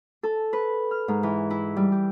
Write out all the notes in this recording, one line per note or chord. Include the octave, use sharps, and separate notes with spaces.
A4
B4
F6
G#2
E3
E4
G3
G4